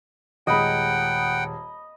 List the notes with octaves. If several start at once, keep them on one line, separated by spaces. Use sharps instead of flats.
D#1 G#3 D#5 F#5 G5 B5